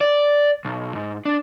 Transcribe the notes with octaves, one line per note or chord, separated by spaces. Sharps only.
D5
B1
G#2
D4